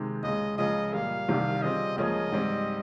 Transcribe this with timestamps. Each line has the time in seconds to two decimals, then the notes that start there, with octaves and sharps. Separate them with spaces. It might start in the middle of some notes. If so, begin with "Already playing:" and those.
Already playing: C3 D#3 G#3
0.23 C#2 C#3 G#3 D#5
0.58 C#2 C#3 F3 D#5
0.93 A#2 G3 A#3 F5
1.29 C2 C3 D#3 G3
1.62 C#3 G3 C4 F4 D#5
1.97 C#2 C#3 F3 A#3 C#4 D#5
2.32 G#2 G3 C4